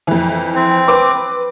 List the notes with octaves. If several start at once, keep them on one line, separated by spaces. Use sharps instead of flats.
F2 E3
C4
B4 D6